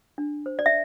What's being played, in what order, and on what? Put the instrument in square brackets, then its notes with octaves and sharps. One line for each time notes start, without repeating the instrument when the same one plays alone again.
[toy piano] D4
C5
D5
E5